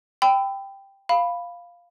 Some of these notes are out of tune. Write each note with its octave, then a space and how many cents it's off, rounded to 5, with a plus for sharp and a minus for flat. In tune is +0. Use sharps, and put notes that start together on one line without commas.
G5 +0 B5 +30 E6 +0
F5 +0 B5 +0